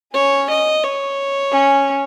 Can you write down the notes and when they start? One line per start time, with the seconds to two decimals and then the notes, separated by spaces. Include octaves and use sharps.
0.14 C#4 C#5
0.50 D#5
0.84 C#5
1.52 C#4